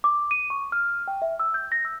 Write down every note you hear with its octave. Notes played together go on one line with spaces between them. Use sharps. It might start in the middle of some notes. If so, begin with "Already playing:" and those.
D6
D#7
C#6
F6
G5
E5
E6
G6
A#6
E6